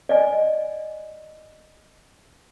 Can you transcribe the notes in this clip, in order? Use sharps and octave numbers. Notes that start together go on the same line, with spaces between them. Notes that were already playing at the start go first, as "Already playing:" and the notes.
D5 D#5 G#5